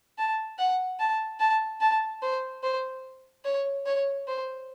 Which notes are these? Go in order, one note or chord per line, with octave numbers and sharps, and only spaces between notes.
A5
F#5
A5
A5
A5
C5
C5
C#5
C#5
C5